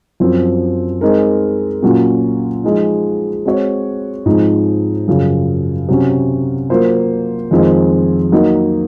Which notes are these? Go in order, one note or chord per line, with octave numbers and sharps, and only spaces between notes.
F#2 F3 C4
G#3 C4 D#4 A#4
A#2 F#3 C#4 F4
F3 G#3 D#4
G#3 C4 F#4 C#5
G#2 F3 G#3 C4 D#4
F#2 C#3 F3
C3 F#3 C#4
F#3 A#3 F4 C5
F2 D#3 G#3 C4 F4
F#3 A#3 D#4